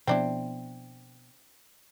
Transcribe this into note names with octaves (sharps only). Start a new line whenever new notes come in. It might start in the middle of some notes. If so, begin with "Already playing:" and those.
B2 F3 B3 C4 D4 E4